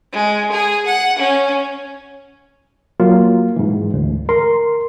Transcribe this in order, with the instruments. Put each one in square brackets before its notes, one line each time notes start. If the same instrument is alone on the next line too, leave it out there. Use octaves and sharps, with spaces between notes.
[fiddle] G#3
G#4
F#5
C#4
[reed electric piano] F#3 A#3 F4
G#2 E3
D2
A#4 C6